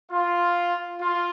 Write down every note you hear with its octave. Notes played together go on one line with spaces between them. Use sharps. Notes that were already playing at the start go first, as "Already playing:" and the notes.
F4
F4